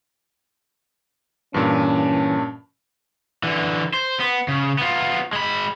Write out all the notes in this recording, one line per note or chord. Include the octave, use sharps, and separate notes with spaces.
G2 A#2 E3 C#4 A5
D3 E3
C5
B3
C#3
B3 F4
G#3 B5